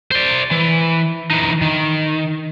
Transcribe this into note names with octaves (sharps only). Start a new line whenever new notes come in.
C5 D5
E3
E3 D#4
D#3